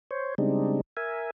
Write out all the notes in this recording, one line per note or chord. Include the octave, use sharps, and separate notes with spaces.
C5 C#5
C#3 G3 G#3 C4 D4 D#4
A#4 E5 G#5